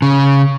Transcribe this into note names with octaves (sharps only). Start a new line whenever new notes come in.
C#3